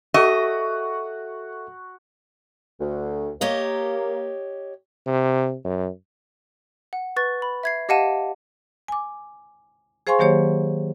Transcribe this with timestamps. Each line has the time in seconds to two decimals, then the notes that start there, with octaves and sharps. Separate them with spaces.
0.14 F#4 A4 D#5 E5 C#6
2.80 D2
3.41 A#3 G4 C#5 D#5
5.07 C3
5.65 F#2
6.93 F#5
7.16 B4 C#6 A6
7.42 B5
7.63 E5 G#6 C7
7.89 G4 D#5 F5 F#5 A5 D#7
8.88 G#5 D6
10.07 G#4 C5 F5 G#5 C6 C#6
10.19 D#3 F#3 A#3 G4 C5 C#5